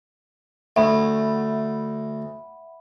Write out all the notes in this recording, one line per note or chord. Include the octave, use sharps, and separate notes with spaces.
D2 E5 F#5 B5